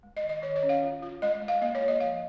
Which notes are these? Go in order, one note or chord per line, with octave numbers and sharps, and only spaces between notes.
G#3
D#5
D#3
D#5
D#3 C#5
C#5
C#4
F5
F4
F4
G#3 D#5
G#3
F5
A#3 D#5
C#5
F4
D#5
F3 F5